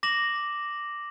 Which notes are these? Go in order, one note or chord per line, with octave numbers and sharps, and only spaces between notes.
D6 A#6 E7 F#7